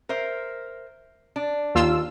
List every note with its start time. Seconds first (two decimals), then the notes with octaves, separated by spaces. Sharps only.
0.09 A#4 C5 E5
1.36 D4
1.75 D#2 F4 E6